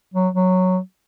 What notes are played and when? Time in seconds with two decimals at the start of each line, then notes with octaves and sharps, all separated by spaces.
0.14 F#3
0.35 F#3